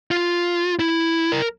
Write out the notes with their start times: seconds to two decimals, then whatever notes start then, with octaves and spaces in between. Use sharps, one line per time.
0.11 F4
0.79 E4
1.32 A#4